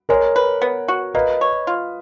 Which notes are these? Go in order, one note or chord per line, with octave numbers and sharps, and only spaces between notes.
G#3 A#4 C#5
B4
B3
F#4
A#3 B4 D#5
C#5
F4